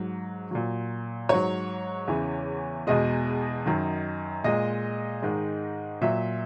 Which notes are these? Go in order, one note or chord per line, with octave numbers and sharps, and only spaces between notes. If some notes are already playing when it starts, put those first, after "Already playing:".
Already playing: G#2 F#3
A#2 F#3
G#2 F#3 C#5
E2 C#3 E3
E2 B2 G#3 D#5
F#2 D#3 F#3
A#2 G#3 D#5
G#2 D#3 G#3
A#2 F#3 E5